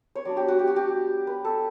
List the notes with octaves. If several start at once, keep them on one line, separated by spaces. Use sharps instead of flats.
C#5
F#3 B3 D4 D5
G4
F#4
G4
F#4
G4
B4
A4